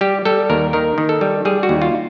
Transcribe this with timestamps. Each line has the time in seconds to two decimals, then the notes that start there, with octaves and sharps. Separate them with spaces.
0.01 G3 G4
0.25 G3 A4
0.50 D#2 A#4
0.73 D#3 A#4
0.98 D#3
1.09 A4
1.21 G3
1.45 G3 G#4
1.63 F#4
1.69 D#2
1.82 F4